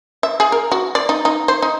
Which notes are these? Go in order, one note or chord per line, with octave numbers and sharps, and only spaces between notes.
E5
G#4
A#4
F#4
D5
D#4
D#4
C5
D#4